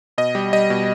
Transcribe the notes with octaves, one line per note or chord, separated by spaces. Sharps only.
B2 D#5
G3
G3 D#5
B2